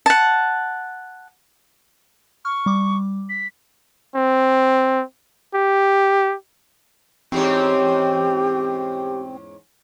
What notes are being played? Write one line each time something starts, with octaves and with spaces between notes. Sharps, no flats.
F#5 A5
C#6 F6
G3 D6
B6
C4
G4
E2 G#2 C4 C#4 G4